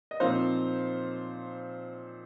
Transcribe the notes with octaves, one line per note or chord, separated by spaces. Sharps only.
D#5
A#2 F3 C4 D#4 C5 F5